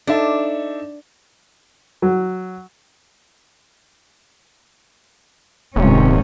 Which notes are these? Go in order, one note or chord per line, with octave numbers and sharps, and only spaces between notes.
D4 D#4 A4 E5
F#3
D#1 G#2 C3 C#4